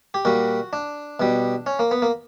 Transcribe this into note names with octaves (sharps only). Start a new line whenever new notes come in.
G4
A#2 G3 F#4
D4
B2 G3
C#4
A#3
B3
A#3